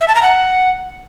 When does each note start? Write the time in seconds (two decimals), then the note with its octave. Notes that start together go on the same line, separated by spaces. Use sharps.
0.01 E5
0.08 A5
0.15 A#5
0.22 F#5